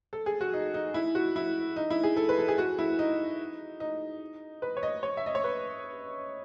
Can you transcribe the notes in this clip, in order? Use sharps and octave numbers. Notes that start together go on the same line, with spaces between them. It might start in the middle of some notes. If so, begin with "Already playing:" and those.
A4
G#4
F#4
D#4
D#4
E4
F#4
E4
D#4
E4
G#4
A4
B4
A4
G#4
F#4
E4
D#4
D#4
B4
C#5
D#5
C#5
E5
D#5
C#5
B4